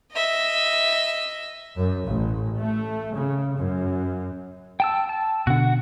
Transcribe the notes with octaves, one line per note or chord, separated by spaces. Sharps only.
D#5 E5
F#2
A1
A3
C#3
F#2
G5 A5 E6
A5
B2 D3 F#4 F#5